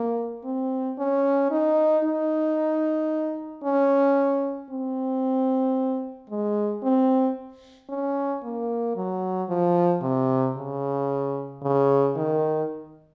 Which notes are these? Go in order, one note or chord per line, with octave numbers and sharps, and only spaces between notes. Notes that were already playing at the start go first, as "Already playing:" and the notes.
Already playing: A#3
C4
C#4
D#4
D#4
C#4
C4
G#3
C4
C#4
A#3
F#3
F3
C3
C#3
C#3
D#3